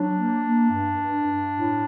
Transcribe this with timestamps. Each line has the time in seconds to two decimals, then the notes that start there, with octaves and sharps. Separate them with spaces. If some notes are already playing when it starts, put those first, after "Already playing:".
Already playing: F#3 D4
0.15 A#3
0.42 A#3
0.70 G2
0.97 G2
1.25 G2
1.53 A2